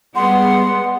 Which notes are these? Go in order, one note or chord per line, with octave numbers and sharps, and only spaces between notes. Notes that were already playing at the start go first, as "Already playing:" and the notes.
G3 G#3 B3 F#5 C6